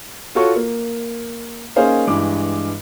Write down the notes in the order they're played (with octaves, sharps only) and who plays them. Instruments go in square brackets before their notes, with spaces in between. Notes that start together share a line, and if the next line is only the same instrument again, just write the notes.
[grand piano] F4 F#4 A4 C#5 C#6
A#3
A#3 C#4 D#4 G#4 C5 F5
G2 E3 G#3 D6